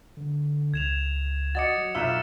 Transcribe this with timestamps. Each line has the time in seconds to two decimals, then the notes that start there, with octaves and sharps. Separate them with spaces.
0.17 D3
0.74 C#2 G#6 E7 F7
1.55 F#4 D#5 D6 A6 C#7
1.77 F#3
1.95 B1 F4 E5 E6 E7